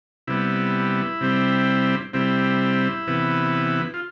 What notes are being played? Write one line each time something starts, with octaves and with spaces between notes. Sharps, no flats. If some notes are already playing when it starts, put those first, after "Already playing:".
C3 G3 B3 E4
C3 G3 C4
C3 G3 C4 E4
C3 E3 B3
F4